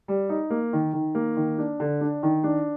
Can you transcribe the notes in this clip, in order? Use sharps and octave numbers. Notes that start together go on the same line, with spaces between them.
G3
D#4
A#3
D#3
D#3
A#3
D#3
D4
D3
D4
D#3
D4